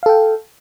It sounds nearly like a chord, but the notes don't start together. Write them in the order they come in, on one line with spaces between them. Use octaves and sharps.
F5 A4 G5